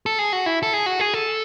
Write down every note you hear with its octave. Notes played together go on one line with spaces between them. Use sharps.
A4
G#4
F#4
E4
A4
G#4
F#4
G#4
A4